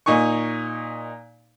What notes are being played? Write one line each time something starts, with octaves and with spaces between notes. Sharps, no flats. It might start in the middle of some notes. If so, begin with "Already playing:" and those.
A#2 D#4 G#5 C#6